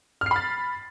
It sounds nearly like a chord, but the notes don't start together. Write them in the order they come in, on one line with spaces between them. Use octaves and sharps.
F6 C7 B5 A6